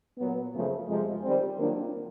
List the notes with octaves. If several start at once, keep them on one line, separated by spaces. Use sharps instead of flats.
A#2 F#3 B3
F#2 C#3 F3 A3
F2 C3 F3 G#3
D#3 G3 C4
D#3 F#3 A#3 D4 F4